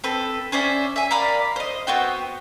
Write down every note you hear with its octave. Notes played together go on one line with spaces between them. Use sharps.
C4 A4 B4
C#4 C5 D5 E5
E5 G#5
A#4 D5 F5 B5
C5 D#5
B3 C4 F#4 G5